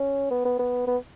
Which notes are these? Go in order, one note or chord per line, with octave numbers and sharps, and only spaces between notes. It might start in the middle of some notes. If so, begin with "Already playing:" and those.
Already playing: C#4
B3
B3
B3
B3